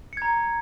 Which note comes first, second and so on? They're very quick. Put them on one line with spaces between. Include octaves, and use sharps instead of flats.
C#7 G#6 A#5